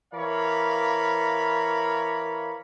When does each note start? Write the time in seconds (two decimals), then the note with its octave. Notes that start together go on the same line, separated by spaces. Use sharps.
0.13 E3 A#4 C#5 D5 F5 B5